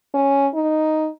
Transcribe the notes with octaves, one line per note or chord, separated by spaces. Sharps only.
C#4
D#4